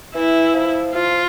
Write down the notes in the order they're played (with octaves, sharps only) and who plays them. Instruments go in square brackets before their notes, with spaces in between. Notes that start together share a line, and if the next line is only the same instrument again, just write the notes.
[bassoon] E3 [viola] E4
[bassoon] F3
[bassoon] F3 [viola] F4